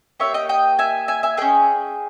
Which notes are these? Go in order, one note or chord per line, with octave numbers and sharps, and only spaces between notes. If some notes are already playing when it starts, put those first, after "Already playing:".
A#3 D#4 G4 C#5 E5
D#5 G5
D#5 G5
E5 G#5
E5 G#5
E5 G#5
C#4 G#4 D#5 G5